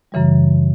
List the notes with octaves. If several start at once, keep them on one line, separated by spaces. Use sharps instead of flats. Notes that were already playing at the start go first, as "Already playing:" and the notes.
F#2 C#3 E3 G3